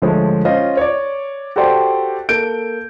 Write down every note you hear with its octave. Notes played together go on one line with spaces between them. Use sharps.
D2 F3 G#3 A4 C#5
C#4 F4 C5 D#5 F5
C#5 D5
F#4 G4 A4 C5 D5 G5
A#3 A4 G6 D7